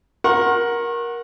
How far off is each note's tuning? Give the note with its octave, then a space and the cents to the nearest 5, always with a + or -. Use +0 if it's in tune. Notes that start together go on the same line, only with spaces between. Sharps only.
A#4 +15 F#5 -5 C#6 -40